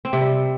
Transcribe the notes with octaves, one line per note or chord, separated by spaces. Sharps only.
C4
C3
G3